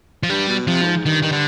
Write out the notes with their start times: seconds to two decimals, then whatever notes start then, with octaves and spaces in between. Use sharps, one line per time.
0.23 F3
0.29 G2 G3
0.48 B2
0.67 C3 F3
0.82 G2
0.87 G#2
1.06 G2 D#3
1.23 D#3
1.32 D3